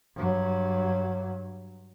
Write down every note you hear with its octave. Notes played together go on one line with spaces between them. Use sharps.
G2 F#3